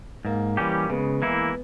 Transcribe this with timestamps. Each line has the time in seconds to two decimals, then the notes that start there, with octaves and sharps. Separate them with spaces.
0.25 G#2 A#3
0.57 E3 G3 C#4 G4
0.89 C#3 G#3 B3
1.22 E3 A#3 E4